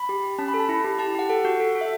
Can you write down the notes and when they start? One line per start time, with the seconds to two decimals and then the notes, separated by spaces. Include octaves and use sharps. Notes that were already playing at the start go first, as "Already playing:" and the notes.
Already playing: B5
0.09 G4
0.23 G4
0.38 C#4 A5
0.48 B5
0.54 A4
0.59 A5
0.69 E4
0.84 G4
0.99 G4 A5
1.15 G4 F#5
1.30 A4 F#5
1.45 F#4
1.60 A4
1.75 A4
1.81 E5